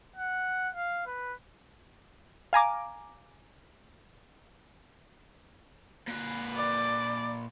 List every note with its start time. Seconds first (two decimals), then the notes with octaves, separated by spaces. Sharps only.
0.16 F#5
0.75 F5
1.06 B4
2.53 F5 G#5 A#5 D6
6.08 A#2 B4
6.55 D5